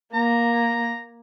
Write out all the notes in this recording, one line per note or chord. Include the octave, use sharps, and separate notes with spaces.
A#3 A#5